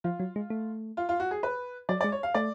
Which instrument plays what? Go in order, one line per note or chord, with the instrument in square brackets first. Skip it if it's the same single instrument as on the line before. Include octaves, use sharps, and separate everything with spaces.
[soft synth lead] F3 [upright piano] F4
[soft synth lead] F#3
G#3
A3
[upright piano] F4
F4
F#4
G#4
B4
[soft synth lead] F#3 [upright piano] D5
[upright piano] D5
[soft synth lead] G#3
[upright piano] C#5
F5
[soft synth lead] A3 [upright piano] D5